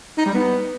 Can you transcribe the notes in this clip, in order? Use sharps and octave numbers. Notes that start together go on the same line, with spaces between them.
D#4
G3
B3